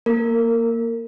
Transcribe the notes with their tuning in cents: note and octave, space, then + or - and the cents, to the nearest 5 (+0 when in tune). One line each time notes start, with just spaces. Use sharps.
A#3 +0 A#4 -25